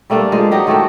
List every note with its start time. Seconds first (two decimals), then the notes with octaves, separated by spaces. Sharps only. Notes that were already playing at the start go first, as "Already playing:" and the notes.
0.10 G3 A3 A#3 D4
0.32 F3 G#3
0.51 F#3 D#4 G4
0.67 D#3 A3 F#4 G4